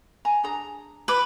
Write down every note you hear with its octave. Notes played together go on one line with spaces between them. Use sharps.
G#5 A#5
D4 G#4 A#5
B4 D6